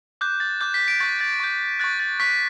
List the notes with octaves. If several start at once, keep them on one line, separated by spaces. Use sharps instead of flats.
D6 F#6 G6
A6
D6 F#6 G6
B6
B6 D7
C#6 G6 A6
A6
C#6 G6
C#6 F#6 A6
A6
C#6 F#6 B6